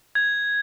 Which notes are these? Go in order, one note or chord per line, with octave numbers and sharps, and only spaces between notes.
G#6